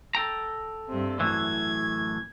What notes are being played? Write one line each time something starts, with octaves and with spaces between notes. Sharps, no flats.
A4 G5 A#5
G2 C3
F#2 A2 E3 G#6